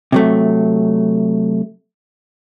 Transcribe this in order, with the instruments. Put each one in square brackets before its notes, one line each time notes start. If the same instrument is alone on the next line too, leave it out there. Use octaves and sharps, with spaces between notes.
[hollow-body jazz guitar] C3 F#3 A3